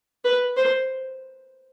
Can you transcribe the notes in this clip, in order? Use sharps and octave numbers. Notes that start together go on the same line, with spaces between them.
B4
C5